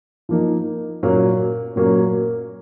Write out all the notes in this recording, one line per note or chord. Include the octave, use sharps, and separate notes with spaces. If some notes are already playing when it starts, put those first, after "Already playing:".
F3 A#3 D#4
A#2 F#3 A#3 C#4
A#2 F#3 A#3 C#4